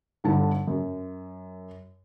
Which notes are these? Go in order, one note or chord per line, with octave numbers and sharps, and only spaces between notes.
G1 G2 D3 A5
F#2